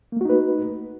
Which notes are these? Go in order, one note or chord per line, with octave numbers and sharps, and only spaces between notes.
A3 A#3 D#4 F#4 B4